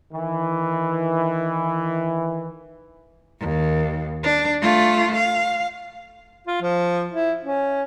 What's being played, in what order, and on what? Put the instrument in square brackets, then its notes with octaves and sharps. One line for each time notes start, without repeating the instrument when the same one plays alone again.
[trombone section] D#3 E3
[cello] D#2
D4
A3 F4
F5
[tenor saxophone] F4
F3
E4
C#4